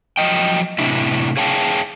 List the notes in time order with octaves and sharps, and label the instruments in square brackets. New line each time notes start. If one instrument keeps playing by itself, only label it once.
[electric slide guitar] F3 F#3 A#3 D#5 G5
A2 C3 D4 E4
G#4 C#5 F5 G5 A5